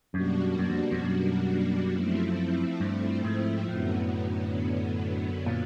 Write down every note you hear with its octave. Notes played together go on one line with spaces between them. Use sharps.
F#2 B2 G3 A#3 D4 F#4
F#2
F2
F2
F#2
F3 A3 C4 E4
G2
G#2
F#2 A2 D3 F#3 B3
A#2